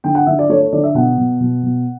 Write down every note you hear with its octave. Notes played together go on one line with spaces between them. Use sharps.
D3 G5
F#5
D3 E5
D5
A3 C#5
C#5
D3 D5
E5
B2 F#5
B2
B2
B2